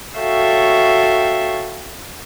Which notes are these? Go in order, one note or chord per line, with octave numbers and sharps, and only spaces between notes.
F#4 A4 C#5 E5 F5 G5